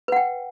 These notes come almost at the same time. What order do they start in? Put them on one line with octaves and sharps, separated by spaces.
B4 F#5 G5